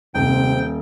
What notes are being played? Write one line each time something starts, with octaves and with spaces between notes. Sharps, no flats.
D#1 G#2 C3 G5